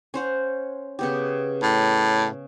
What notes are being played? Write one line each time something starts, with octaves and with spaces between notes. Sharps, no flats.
C#4 C5 F#5
C#3 B3 G4
A2